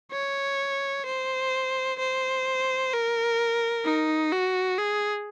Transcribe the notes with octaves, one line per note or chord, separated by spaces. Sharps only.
C#5
C5
C5
A#4
D#4
F#4
G#4